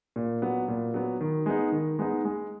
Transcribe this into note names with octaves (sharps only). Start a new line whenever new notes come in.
A#2
F#3 B3
A#2
F#3 B3
D#3
G#3 B3 D#4
D#3
G#3 B3 D#4
G#3